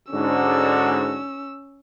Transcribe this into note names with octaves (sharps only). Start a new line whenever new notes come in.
G#2 D3 C#4 F#4 E6